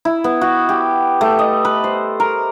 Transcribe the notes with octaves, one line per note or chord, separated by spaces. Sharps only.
E4
B3
F#4
G4
A3
D#5
B4
C5
A#4